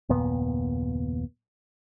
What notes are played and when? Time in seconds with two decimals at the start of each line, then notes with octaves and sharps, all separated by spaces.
0.09 F#1 D#2 A#2 B3